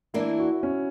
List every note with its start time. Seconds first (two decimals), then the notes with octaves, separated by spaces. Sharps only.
0.14 E3 A#3 D4 E4
0.39 F#4
0.63 C#4